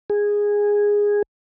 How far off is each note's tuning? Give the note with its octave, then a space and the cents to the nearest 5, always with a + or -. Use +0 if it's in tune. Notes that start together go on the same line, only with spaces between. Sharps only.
G#4 -10